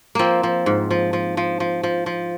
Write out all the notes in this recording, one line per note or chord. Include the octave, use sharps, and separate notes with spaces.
F3 A#3 C4
F3
G#2
F3
F3
F3
F3
F3
F3